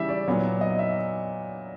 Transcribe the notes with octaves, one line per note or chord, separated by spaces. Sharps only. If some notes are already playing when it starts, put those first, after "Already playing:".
Already playing: C#3 E3 G3 E5
D5
A#2 F#3 B3
D#5
E5